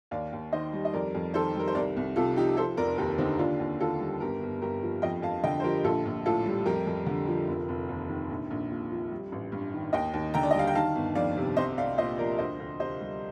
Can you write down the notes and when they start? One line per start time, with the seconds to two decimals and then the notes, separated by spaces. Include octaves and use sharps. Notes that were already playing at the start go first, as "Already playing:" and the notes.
0.11 D#2 D5 F5
0.32 D#2
0.53 D#3 C5 D#5
0.73 G3
0.85 D#5
0.94 F2 A#4 D5
1.15 F2
1.34 D#3 A4 C5
1.56 G3 A#4
1.68 C5
1.75 C2 A#4 D5
1.97 C2
2.16 C3 F4 A4
2.36 F3 D#4 G4
2.57 F3 A4 C5
2.77 F1 A#4 D5
2.98 D#2 G4 A#4
3.18 D3 C4 D#4
3.38 D#2 D4 F4
3.59 D#2
3.80 D#3 F4 A4
4.00 G3
4.20 G1 G4 A#4
4.41 G1
4.62 G2 G4 A#4
4.83 F3
5.02 F2 D#5 G5
5.22 F2 F5 A5
5.44 D3 D#5 G5
5.60 C5
5.63 F3 G4 A#4
5.84 A#1 F4 A4
6.05 A#1
6.26 A2 F4 A4
6.46 G3
6.66 F2 G4 A#4
6.87 F2
7.06 D3
7.28 F3
7.48 F1
7.69 F1
7.88 D#2
8.09 D#3
8.30 A#1
8.50 A#1
8.70 A#2
8.91 F3
9.11 G3
9.32 A1
9.52 G2
9.73 D#3
9.93 D#2 D#5 G5
10.14 D#2
10.34 D3 G5 A#5
10.43 D5
10.51 D#5
10.54 G3
10.59 F5
10.67 G5
10.75 D#3 F5 A5
10.95 G1
11.15 F2 D5 F5
11.37 C3
11.57 C2 C5 D#5
11.77 C2 D5 F5
11.98 A#2 C5 D#5
12.18 F3 A#4 D5
12.39 D2 C5 D#5
12.59 D2
12.80 C3 C5 D#5
13.01 G3